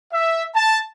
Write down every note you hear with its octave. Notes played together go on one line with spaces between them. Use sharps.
E5
A5